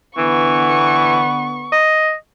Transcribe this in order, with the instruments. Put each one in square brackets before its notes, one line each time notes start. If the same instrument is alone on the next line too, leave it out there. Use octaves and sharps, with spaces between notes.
[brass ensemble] D3 B3 [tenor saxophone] E3 [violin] C#6
[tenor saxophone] D#5